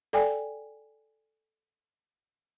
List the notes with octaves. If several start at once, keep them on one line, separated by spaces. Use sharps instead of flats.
A4 D5 G5 G#5